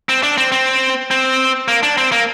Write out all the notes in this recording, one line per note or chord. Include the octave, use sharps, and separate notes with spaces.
C4
D4
C4
C4
C4
A#3
D4
C4
A#3